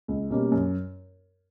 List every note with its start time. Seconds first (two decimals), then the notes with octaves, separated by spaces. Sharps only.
0.08 C#2
0.30 B2 G3 A#3 C#4
0.52 F#2